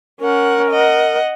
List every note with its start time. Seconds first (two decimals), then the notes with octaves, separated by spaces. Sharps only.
0.20 C#4 A#4 F#5
0.71 D#5 F#5